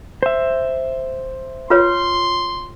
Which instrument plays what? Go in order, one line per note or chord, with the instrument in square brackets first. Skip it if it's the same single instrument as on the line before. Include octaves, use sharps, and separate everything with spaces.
[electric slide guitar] C5 E5
[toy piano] F4 B4 C#5 [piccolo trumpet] C6